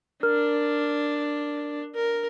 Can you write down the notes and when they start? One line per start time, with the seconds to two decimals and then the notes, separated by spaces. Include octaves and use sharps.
0.23 D4 A#4
1.95 A#4